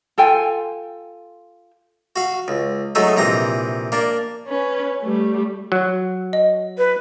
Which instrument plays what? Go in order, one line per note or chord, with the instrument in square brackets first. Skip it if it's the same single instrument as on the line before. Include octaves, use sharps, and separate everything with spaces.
[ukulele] F4 A4 G5 G#5
[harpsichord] F#4 F5
C#2
F#3 G#3 A3 D#4 E5
A#1 C3 E3 A#5
A#3 D4
[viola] C#4 B4
G3 A3
[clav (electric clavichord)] F#3
[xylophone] D#5
[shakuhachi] B4